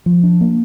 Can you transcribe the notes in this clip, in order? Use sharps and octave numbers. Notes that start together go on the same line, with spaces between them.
F3
D4
A#3